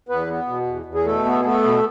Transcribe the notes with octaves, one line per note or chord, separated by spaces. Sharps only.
E2 B3 B4
B3
B2
E2
E2
G#4
B2 A3 A4
B3
G#4
A3 B3 A4
B2